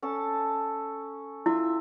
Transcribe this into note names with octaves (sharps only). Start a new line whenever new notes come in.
C#4 A4 A5
E4 F4 E5